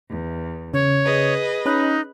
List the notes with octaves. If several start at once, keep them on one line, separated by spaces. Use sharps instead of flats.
E2
C#3 C#5
G#4 B4 D#5
C#4 D#4 B5 F#6